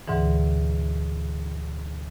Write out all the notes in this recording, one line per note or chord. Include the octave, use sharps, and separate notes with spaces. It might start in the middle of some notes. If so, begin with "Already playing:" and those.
D2 G#2 B2 D3 E3